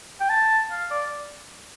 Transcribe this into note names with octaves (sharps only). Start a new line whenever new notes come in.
G5
A5
F5
D5